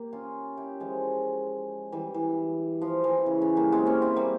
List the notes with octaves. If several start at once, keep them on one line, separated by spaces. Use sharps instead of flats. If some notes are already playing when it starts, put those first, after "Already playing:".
Already playing: A#3 G4
C#4 F4
E4 G4
F3 G#3
E3 G3
E3
F3
E3
C#3
C#3
G3 A#3
G#3 C4
A#3 C#4
C4 E4
G3 A#3